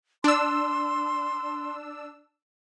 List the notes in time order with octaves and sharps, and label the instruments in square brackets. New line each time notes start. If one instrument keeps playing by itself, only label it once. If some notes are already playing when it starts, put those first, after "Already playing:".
[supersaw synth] D4 E6 [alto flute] C6